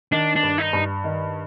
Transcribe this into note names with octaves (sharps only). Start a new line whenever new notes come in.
D#3 D4
D4
G2
D#4
G2
D#3